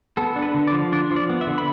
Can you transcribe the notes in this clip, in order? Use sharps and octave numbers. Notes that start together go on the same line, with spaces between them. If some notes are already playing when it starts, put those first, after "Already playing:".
B3 A4
D4
B4
D3
D5
F3
D4 D5
F3
D5
B3
E5
D3
B5